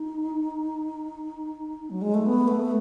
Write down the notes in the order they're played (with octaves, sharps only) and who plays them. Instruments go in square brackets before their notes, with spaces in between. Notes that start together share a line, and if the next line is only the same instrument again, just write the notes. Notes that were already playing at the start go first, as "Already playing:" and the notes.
Already playing: [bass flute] D#4
F#3
G#3
A3
B3
A3